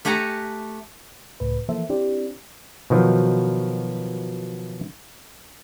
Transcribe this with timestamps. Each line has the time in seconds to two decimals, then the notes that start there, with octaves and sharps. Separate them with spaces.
0.05 A3 G4 F#5 G#5 A#5
1.40 C#2 A2 B4
1.69 E3 F3 A#3 A4 C5 E5
1.90 C4 D4 E4 G4 C5 D5
2.90 B2 D#3 F3 F#3